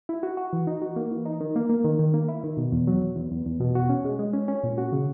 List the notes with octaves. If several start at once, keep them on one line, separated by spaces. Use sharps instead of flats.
E4
F#4
F#4
E3
D#4
F#4
A#3
E3
D#4
D#3
A#3
A#3
D#3
D#3
A#3
E4
D#3
B2
E2
F#3
E2
E2
E2
E2
B2
F#4
C#4
G#3
G#3
C#4
C#4
A#2
F#4
C#3